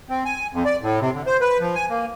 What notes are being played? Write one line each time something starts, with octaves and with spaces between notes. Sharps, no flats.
C4
G#5
F2
D5
A2
C3
D3
C5
B4
F3
G#5
A#3